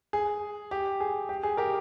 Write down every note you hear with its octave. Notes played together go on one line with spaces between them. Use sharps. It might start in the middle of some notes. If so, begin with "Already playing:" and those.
G#4
G4
G#4
G4
G#4
G4 A#4